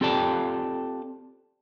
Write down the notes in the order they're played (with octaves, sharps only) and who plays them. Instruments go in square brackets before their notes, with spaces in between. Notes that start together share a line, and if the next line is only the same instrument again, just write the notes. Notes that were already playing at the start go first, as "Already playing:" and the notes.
[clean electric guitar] C4 F4 G4 A4 D5 A5